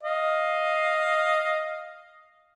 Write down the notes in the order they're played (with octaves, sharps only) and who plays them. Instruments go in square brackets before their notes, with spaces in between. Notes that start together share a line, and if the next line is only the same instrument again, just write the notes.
[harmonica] D#5 F5